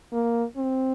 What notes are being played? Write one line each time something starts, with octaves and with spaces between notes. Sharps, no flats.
A#3
C4